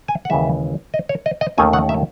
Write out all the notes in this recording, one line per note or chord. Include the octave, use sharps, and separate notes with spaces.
G#5
F#5
D#2 C#3 E3 G#3 E5
D#5
C#5
D#5
D#5
D#2 D#3 A3 C#4 G#5
F#5
E5